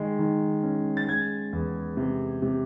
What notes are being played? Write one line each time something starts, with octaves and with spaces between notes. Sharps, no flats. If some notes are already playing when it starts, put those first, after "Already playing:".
Already playing: D#3 G#3
D#3
C#4
A6
G#3 G#6
E2
C3
C3